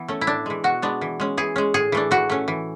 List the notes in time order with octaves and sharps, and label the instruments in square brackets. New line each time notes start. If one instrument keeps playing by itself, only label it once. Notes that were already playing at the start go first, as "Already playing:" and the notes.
Already playing: [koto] E3 B3
A3 C#4
E4
A2 D4
E3 G#3
B2 F#4
G#3 B3 D4
E3
G#3 C#4
E3 G#4
G#3 C#4
A2 G#4
E3 A3 D4
E3 F#4
A3 C#4
E3